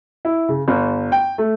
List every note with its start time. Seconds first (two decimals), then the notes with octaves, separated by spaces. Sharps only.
0.25 E4
0.49 C#3
0.68 G1
1.12 G5
1.38 A3